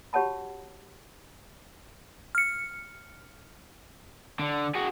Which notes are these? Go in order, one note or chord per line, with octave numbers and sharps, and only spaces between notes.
F#4 G4 C#5 F#5 A5 B5
F6 C#7
D3
F#4 G#4